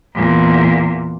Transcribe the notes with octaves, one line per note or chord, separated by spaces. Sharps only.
E2 A#2